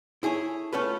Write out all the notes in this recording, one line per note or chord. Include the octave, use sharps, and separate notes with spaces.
E4 G#4 A4 C#5
A3 C#4 F4 A4 B4